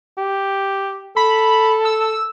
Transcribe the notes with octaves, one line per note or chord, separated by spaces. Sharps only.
G4
A4 B5
E6